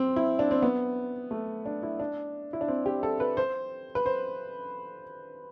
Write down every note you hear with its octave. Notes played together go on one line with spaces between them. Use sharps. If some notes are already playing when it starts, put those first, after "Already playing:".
Already playing: C4
E4
D4
C4
B3
A3
D4
E4
D4
E4
D4
C4
G4
A4
B4
C5
B4
C5